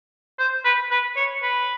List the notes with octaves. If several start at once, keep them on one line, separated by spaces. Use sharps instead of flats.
C5
B4
B4
C#5
B4